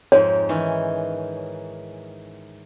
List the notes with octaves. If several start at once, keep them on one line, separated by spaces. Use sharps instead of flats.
F2 G#2 F3 C#5
D#3 E3 C#4